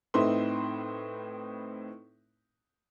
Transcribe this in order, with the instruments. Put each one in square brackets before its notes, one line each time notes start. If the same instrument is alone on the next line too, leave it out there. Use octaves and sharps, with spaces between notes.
[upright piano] A2 C4 D#4 E4 B4 C6